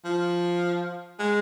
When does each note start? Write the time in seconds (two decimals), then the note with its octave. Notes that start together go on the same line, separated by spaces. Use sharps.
0.05 F3
1.19 G#3